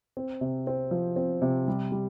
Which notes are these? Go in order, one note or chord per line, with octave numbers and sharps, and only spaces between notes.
C4
C3
C4
F3
C4
C3
G3
G3